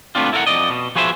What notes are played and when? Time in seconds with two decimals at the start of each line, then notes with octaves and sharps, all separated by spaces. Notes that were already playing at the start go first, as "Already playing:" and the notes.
0.15 A3 B3 C4 D4 F4
0.33 E4 A4 A#4 F5 F#5
0.47 F2 D5 D#5
0.70 B2
0.95 F3 F#4 G#4 B4 C5 E5